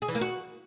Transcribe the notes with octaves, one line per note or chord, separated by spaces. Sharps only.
G#4
E3
A#3
F#4